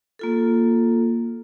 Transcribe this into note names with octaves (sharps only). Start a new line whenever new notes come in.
A#3 F4 A4